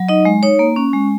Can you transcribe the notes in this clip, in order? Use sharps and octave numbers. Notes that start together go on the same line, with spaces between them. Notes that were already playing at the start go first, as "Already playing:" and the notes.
Already playing: F#3
D#4 D#5
G#3
D#4 C#5
A#3
C#4
G#3